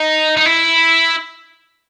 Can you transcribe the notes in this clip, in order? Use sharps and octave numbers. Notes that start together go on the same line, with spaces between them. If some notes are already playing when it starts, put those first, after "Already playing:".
Already playing: D#4
D#4
E4